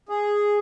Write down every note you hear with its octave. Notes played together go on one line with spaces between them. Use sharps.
G#4